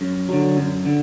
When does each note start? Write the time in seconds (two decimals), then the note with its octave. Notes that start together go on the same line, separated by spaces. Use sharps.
0.01 F#2
0.29 D3 F#3
0.57 F#2
0.85 D3